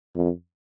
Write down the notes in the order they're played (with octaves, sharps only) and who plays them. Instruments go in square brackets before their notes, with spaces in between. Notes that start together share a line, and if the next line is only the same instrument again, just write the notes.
[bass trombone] F2